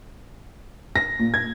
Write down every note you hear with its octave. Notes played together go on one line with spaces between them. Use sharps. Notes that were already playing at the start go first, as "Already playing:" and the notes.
A#6
A#2
G#6